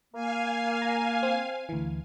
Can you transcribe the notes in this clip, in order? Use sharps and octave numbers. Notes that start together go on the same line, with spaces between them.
A#3 F5 G#5
A#5
C4
D2 E3